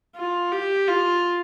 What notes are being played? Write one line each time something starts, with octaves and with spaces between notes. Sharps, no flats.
F4
G4
F4